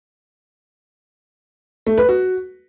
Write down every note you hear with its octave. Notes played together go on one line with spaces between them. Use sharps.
A3
B4
F#4